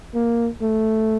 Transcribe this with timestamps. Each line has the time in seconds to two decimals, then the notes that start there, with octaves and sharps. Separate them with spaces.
0.14 A#3
0.62 A3